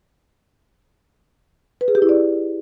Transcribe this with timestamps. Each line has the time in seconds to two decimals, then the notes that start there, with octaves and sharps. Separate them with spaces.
1.81 B4
1.88 G#4
1.95 G4
2.02 E4
2.09 D5